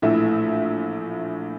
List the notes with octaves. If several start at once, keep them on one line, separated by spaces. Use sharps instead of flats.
A#1 A2 E3 A3 E5